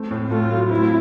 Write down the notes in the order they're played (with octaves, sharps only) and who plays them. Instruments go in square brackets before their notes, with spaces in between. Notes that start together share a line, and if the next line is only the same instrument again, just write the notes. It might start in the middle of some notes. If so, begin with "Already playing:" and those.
Already playing: [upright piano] A3 C4
A2
[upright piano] A3 [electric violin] F4
[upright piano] F#3
[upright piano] C4 [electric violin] E4